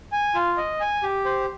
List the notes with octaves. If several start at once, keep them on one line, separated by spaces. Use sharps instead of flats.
G#5
F4
D#5
G#5
G4
C5